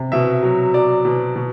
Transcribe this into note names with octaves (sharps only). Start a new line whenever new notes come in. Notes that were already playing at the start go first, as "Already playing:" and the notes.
Already playing: C3
B2 E5
F#3
F#3 D5
B2
B2